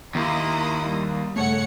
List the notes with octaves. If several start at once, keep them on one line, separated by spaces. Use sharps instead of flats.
D#2 E4 A#5 C6 D#6
G3
G2 C#3 A3 C#5 F#5 C#7